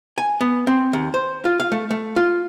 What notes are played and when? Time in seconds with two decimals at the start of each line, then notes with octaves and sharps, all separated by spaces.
0.18 G#5
0.41 B3
0.67 C4
0.93 D#2
1.14 C5
1.45 F4
1.60 F5
1.72 A3
1.91 A3
2.16 F4